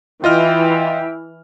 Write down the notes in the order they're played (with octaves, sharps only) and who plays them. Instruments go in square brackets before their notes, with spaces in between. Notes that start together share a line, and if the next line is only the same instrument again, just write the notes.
[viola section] E3 [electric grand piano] F4 D#5 F6 [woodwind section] E5 G5